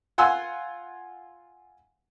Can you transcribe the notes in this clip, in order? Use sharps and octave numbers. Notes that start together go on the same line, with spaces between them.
F4 F#5 G#5 C6 E6